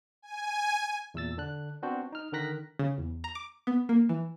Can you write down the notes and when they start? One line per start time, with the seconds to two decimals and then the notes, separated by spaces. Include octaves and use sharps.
0.22 G#5
1.14 E2 A#2 E6 A6
1.38 D3 D4 F#6
1.82 B3 C4 D4 F#4 C5
2.12 D#4 F6
2.33 D3 D#3 A#4 F#6 A#6 B6
2.79 C#3
2.98 E2
3.24 A#5
3.35 D6
3.67 B3
3.89 A#3
4.09 E3